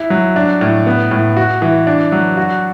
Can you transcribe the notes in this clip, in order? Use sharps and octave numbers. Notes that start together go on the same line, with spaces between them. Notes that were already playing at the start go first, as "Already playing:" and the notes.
Already playing: E4
F#3
D4
A2
B3
A2
F#4
E3
D4
F#3
F#4